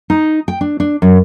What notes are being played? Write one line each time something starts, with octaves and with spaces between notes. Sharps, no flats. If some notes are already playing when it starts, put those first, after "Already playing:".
D#4
G5
D4
D4
F#2